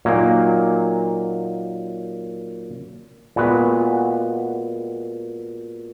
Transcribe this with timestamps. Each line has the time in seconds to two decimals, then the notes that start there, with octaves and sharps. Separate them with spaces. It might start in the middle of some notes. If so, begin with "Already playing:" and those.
0.05 A#2 F#3 A#3 D#4
3.36 A#2 G#3 B3 F#4 B4